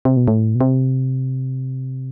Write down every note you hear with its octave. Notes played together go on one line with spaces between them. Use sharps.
C3
B2
A2
B2
C3